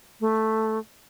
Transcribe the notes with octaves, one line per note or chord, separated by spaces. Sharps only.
A3